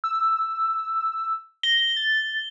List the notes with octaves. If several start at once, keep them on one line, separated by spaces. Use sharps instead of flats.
E6
A#6 G7
A6